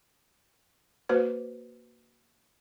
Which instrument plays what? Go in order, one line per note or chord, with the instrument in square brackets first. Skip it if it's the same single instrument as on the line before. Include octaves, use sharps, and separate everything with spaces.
[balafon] A#3 F#4 B4 C5